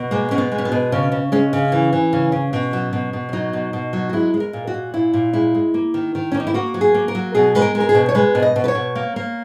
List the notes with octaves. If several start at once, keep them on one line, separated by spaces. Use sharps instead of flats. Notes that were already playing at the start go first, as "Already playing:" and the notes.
Already playing: B2
G#3 A#3
B2 C#4
B3
G#3
C#4
B3
B2
C#3 C#4
C#3
G#3 C#4
C#3
E3
E3
C#3
C#3
B2
F#3
B2
B2
C#4
F#3 D#4
B2
B2
F#3
F#4
G#3 E4
G#3
A#4
A#2
F#4
A#2
A#2 E4
A#2
G#3 E4
G#3
A#3
D#3
D#3
C#4
A#3
D#4
E4
A#3 F#4
F#3
G#4
A#3
A#4
F#3
B2 G#4
G#3 B4
A#4
G#3
A#4
G#4
B2
C#5
G#3 B4
B2
D#5
B2
B4
C#5
B2
A#3
A#3